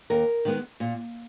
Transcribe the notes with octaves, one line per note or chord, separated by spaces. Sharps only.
D#2 A#4
D#3 G#3 B3
A#2